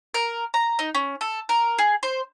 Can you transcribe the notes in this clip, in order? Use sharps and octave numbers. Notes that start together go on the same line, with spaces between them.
A#4
A#5
D#4
C#4
A4
A#4
G#4
C5